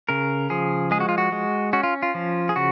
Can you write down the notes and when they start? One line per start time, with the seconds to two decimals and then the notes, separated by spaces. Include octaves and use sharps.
0.09 C#3 A#4
0.50 F3 G#4
0.91 G#3 G#4
1.00 F#4
1.09 F4
1.18 F#4
1.32 G#3
1.73 C#4 F#4
1.83 F4
2.03 F4
2.14 F3
2.49 G#4
2.56 C#3 F#4